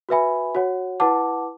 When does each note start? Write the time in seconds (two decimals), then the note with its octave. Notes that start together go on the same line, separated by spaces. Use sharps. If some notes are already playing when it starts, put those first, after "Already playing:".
0.09 F#4 B4 E5 G#5 B5
0.55 F#4 C#5 F#5
1.00 E4 B4 F#5 A5 D6